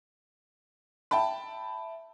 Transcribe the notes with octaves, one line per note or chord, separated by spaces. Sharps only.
E5 G5 A5 B5